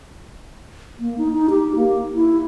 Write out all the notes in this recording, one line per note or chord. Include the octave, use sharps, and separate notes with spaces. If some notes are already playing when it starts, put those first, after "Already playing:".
A#3
D#4
D#4
G4
A#3
E4